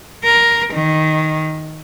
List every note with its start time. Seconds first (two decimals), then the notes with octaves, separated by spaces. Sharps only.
0.24 A#4
0.74 D#3